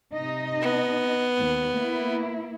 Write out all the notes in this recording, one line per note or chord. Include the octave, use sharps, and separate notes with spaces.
C3 D#4 D#5
B3
D#2
A#3 E4